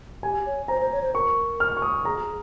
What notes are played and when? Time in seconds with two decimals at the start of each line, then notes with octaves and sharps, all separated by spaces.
0.23 G4 G#5
0.46 C#5
0.68 C5 A#5
0.81 C5
0.92 C#5
1.02 C5
1.14 A#4 C#6
1.60 F6
1.77 C#6
1.82 D#6
2.05 G#4 A#5
2.20 G#4